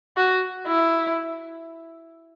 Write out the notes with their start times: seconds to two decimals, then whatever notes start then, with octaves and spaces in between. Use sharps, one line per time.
0.17 F#4
0.67 E4